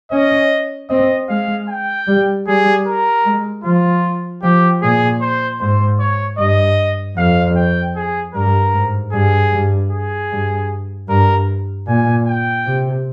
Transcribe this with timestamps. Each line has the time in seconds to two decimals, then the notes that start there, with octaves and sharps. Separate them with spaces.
0.11 C#4 D#5
0.89 C4 D#5
1.29 G#3 F5
1.69 G5
2.07 G3
2.47 G3 G#4
2.86 A#4
3.25 G#3
3.64 F3 F4
4.42 F3 G4
4.81 A#2 G#4
5.21 C5
5.60 G#2 C5
5.99 C#5
6.38 G2 D#5
7.17 F2 F5
7.56 G5
7.95 G#4
8.34 G2 A#4
8.74 G#2
9.12 G2 G#4
9.52 G2
9.92 G#4
10.31 G2
11.08 G2 A#4
11.87 A#2 G#5
12.27 G5
12.65 C3